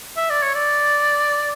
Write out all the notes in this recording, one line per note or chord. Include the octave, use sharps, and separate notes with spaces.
E5
D5
C#5
D5